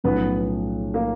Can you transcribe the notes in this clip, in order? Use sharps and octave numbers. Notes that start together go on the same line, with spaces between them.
B1 A2 F3 A3 B3 C#4 B4
A#3 A#4